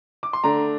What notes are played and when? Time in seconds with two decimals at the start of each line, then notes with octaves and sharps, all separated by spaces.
0.23 D6
0.33 C6
0.44 D3 A3 D4 A#5